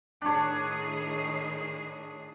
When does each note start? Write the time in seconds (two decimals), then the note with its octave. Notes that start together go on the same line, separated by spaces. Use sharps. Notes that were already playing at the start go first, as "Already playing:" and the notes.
0.22 A2 D#3 D4 G#4 C#5